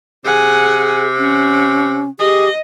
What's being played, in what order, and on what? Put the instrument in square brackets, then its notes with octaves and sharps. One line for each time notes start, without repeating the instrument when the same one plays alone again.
[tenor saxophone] C3 [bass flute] G#4 [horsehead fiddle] F#5 G#5
[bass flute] C#4 [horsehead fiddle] F#5
[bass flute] G4 [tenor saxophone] G#4 [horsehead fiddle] D#5